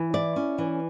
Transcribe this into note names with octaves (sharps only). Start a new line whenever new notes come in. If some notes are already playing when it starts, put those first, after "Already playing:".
Already playing: E3
E4 D5
C#4
E3